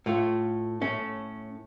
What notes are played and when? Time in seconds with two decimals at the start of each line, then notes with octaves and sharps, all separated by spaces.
0.06 A2 A3 F4
0.81 A2 A3 C#4